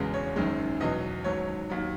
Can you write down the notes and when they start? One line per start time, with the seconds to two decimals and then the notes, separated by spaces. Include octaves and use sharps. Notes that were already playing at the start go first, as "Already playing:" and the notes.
Already playing: E1 E2 C#3 G#3
0.14 C#5
0.36 F#1 F#2 D#3 G#3
0.81 E2 B2 F#3 D#5
1.24 G#1 G#2 F#3 C#5
1.70 D#2 D#3 F#3